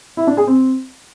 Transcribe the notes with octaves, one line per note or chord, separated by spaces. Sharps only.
E4
D4
G#4
C4